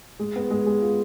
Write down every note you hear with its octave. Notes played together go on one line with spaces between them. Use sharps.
G#3
B3
G#3
G#3
F4